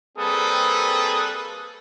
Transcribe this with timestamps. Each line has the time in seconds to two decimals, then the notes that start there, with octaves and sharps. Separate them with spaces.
0.18 G3 A#3 C4 G#4 A4 B4